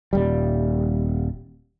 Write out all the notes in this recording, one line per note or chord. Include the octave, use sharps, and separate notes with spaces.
D#1 G3